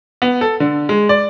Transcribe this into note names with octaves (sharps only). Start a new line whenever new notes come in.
B3
A4
D3
G#3
D5